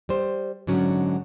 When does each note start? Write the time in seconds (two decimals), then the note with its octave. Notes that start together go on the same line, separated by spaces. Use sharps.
0.09 G3 C5
0.67 G#2 D3 F#3 C#4